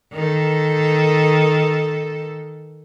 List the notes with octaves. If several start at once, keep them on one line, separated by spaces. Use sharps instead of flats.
D#3 A4